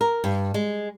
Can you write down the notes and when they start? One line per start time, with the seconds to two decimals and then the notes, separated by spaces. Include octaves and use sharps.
0.01 A#4
0.24 G2
0.54 G#3